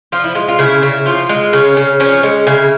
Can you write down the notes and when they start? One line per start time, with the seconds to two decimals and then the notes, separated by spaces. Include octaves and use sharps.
0.12 F3 F4
0.24 E4
0.35 G#3 F4
0.48 F4
0.59 C#3 E4
0.82 C#3
1.06 F3 F4
1.29 G#3
1.53 C#3 C#4
1.77 C#3
2.00 F3 C#4
2.23 G#3
2.47 C#3 E4